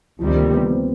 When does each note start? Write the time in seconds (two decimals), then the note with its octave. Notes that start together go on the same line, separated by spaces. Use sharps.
0.19 D2 C3 D#3 F3 G3
0.36 A#3
0.54 B3
0.71 C4